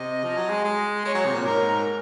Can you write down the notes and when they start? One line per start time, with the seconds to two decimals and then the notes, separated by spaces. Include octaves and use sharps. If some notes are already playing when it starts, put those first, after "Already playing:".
Already playing: C3 D#5
0.24 F3
0.37 F#3
0.50 G#3
0.64 G#3
1.05 G#3 C#5
1.14 F#3
1.25 C3
1.35 A#2
1.45 G#2 A#4